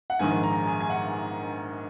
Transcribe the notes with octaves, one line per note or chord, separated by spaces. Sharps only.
F#5
A#1 G#2 D#3 G#5
A#5
G#5
G#5
F#5